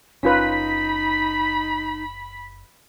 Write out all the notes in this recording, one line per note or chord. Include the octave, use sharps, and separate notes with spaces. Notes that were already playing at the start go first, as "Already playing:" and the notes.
F#1 C#4 D#4 F4 B4 B5 B6